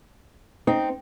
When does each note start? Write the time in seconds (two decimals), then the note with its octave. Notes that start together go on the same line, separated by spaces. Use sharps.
0.67 C4 D#4